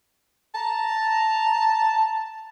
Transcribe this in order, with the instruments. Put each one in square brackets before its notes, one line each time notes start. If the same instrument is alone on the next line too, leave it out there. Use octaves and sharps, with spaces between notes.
[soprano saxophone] A5 [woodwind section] A#5